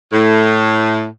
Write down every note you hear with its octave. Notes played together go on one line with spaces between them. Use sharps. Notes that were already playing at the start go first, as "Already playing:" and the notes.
A2